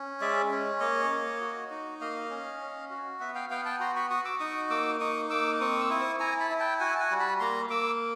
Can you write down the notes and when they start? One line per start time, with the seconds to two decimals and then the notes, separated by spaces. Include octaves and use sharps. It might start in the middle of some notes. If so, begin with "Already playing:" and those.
Already playing: C#4
0.21 G#3 D5 E5
0.51 C#4
0.80 A#3 C#5 D#5
1.10 A#3
1.40 F#4
1.70 D#4
2.01 A#3 D#5 F5
2.30 C#4
2.61 C#4
2.90 F#4
3.20 B3 E5 F#5
3.35 F5 G5
3.50 B3 F5 G5
3.65 G5 A5
3.80 F#4 A#5 C6
3.96 B5 C#6
4.10 F#4 C#6 D#6
4.25 D6 E6
4.40 D#4 C#6 D#6
4.70 A#3 D6 E6
5.00 D#4 C#6 D#6
5.30 A#3 D6 E6
5.60 C4 C#6 D#6
5.81 E6
5.90 E4 C#6 D#6
6.20 E4 G#5 A#5
6.40 A5 B5
6.51 E4
6.60 G5 A5
6.80 F#4 F#5 G#5
6.95 A5
7.00 F#5 G#5
7.11 G3
7.20 A5 B5
7.40 A#3 A#5 C6
7.70 A#3 D6 E6